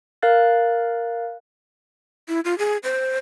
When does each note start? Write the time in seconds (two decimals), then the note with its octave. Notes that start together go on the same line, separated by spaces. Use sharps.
0.22 A#4 F5 F#6 A6
2.29 E4
2.45 F4
2.58 G#4
2.84 C5